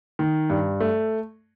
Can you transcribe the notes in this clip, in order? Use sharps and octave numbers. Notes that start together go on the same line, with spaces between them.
D#3
G2
A3